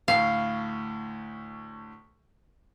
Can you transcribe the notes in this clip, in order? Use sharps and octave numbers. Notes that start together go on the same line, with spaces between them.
D2 A2 F5